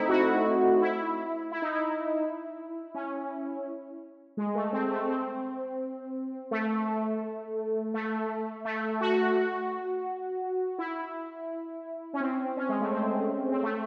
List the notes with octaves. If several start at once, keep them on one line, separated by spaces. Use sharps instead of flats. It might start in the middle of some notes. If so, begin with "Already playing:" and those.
Already playing: A3 C4 D#4 E4
F#4
E4
E4
D#4
E4
C#4
G#3
A3
C4
A3
C4
A3
A3
A3
F#4
F#4
E4
C#4
C4
C#4
G#3
A3
C4
C4
A3